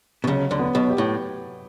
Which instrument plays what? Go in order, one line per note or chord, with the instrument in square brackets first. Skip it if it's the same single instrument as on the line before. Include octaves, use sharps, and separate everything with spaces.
[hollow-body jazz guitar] B2
[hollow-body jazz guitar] C#2 C#3 [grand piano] F#3
[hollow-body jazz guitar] D2 D3
[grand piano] B3
[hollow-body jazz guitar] B1 B2
[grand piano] G4
[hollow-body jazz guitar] A2